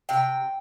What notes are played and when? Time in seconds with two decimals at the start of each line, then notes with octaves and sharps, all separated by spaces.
0.09 C3 G5